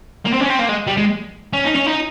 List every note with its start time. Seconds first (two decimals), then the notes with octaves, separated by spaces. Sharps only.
0.26 A#3
0.33 C4
0.41 C#4
0.50 C4
0.59 A#3
0.69 G#3
0.87 G3
0.97 G#3
1.53 C#4
1.64 D#4
1.75 C#4
1.86 D#4